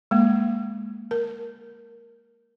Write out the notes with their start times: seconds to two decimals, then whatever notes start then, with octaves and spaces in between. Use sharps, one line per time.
0.11 G#3 A#3
1.11 A#4